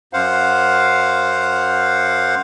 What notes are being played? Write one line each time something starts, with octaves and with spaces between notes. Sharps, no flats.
F#2 C5 F5 F#5